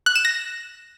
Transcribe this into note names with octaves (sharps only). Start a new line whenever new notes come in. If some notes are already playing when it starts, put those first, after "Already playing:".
F#6
E7
A#6